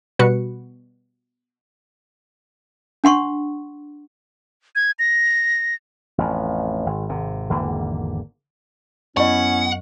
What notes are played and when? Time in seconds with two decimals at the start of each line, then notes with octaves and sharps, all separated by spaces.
0.19 B2 G3 F#4 B4 C#7
3.04 D4 F#5 C6 C#6
4.76 G#6
4.99 A#6
6.18 A1 F2
6.86 G#1
7.09 G#1 C3
7.50 G#1 E2 D3 A#3
9.17 F#2 B3 C#4 E4 D#5 F#5 C#6